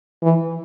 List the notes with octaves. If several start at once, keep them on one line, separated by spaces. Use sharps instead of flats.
E3